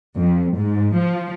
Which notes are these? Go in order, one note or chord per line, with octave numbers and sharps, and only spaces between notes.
F2
G#2
F3